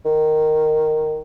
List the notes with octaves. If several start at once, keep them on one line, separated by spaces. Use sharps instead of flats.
D#3